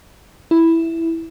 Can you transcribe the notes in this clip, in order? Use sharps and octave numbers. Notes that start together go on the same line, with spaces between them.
E4